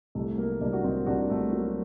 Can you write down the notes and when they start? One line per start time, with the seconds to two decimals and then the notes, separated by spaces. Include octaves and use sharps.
0.15 C2 A3
0.38 F#3 A#3
0.61 C2 A#3 D4
0.73 F#4
0.84 C2 C4 D#4
1.07 C2 D4 F#4
1.30 C3 A3
1.53 F#3 A#3